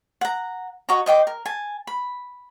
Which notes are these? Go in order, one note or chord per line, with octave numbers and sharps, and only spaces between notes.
F#5 A#5
F#4 C#5 D#5 A#5
C5 D#5 G5 D6
A#4
G#5 A5
B5